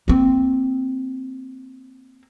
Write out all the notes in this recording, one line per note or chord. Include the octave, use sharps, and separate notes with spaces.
A#3 C4